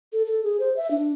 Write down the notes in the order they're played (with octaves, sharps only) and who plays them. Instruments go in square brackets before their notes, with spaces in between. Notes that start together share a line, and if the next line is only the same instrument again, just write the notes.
[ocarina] A4
A4
G#4
C5
E5
D4